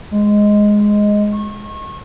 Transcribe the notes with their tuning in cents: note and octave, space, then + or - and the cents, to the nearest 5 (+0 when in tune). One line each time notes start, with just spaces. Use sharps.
G#3 +0
C#6 -30